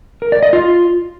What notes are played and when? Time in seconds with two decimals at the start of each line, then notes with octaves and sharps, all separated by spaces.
0.22 A#4
0.32 D5
0.43 D#5
0.53 F4